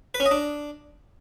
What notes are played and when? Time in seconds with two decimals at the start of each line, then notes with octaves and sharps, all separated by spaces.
0.14 B4
0.20 C#4
0.26 D#5
0.31 D4